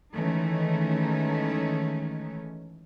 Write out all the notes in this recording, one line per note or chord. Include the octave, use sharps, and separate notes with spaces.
D#3 E3 G#3 A3 C#4 D#4